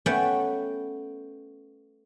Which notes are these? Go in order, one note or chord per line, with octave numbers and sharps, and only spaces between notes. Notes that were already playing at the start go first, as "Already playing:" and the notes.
A3 B3 C#4 F#5 G5 A5